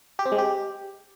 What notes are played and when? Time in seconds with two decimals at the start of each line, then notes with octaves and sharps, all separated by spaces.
0.19 G4
0.25 C4
0.32 G#3
0.38 G4